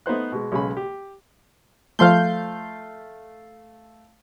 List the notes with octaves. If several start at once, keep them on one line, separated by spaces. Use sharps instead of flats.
A3 B3 D#4 C5 F#6
B2 G#3
B1 C#3 G#3 G#5 B5
G4
F3 A3 F5 C6 G6